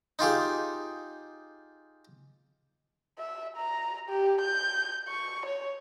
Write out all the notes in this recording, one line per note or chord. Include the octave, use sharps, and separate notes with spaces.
D#4 F4 G4 G#4
E5
A#5
G4
G6
C#6
C#5